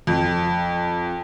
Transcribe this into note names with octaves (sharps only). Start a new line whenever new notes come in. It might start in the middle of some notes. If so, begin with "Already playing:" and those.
F2